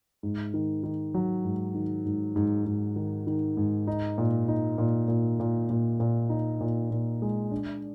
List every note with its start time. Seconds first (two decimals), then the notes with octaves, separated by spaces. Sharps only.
0.23 G#2
0.54 D#3
0.83 D#3
1.14 F#3
1.44 G#2
1.74 D#3
2.05 G#2
2.36 G#2
2.65 G#2
2.96 D#3
3.27 D#3
3.57 G#2
3.87 D#4
4.18 A#2
4.48 D#4
4.78 A#2
5.08 A#2
5.40 A#2
5.70 A#2
6.00 A#2
6.30 D#4
6.61 A#2
6.91 A#2
7.22 G#3
7.51 D4